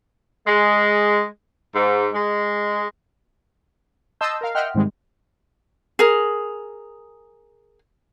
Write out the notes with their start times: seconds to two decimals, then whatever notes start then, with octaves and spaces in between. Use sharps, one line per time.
0.47 G#3
1.75 G#2
2.13 G#3
4.21 D#5 A5 C6 E6 G6
4.41 A#4 F5
4.55 D#5 E5 F#5 G5 C6 F6
4.75 G#2 C3 D#3 G3 G#3
5.99 G#4 A#4